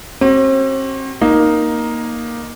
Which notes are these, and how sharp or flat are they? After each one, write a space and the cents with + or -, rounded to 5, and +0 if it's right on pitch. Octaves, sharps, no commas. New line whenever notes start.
C4 +40 F#4 +45
A#3 +10 D#4 +0